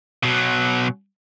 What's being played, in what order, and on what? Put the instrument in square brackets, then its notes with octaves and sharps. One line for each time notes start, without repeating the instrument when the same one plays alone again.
[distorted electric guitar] B2 F#3